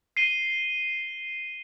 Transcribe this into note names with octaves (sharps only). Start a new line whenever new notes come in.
C7 D#7 G7